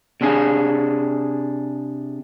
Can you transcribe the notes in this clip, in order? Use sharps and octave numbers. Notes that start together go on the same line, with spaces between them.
C3 D4 G#4